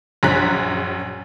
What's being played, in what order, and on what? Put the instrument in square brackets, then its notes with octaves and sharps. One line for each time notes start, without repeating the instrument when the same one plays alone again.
[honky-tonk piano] A#1 F#2 G#4 A#5 F#6 B6